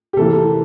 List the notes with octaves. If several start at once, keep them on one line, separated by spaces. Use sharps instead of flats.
G4
C3 E3 A#3 A4